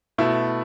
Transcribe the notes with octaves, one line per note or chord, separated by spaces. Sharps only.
B2 A3 E4